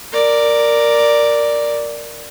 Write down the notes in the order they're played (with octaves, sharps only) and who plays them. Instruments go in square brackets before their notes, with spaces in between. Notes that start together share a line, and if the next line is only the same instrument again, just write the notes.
[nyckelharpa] A#4 D5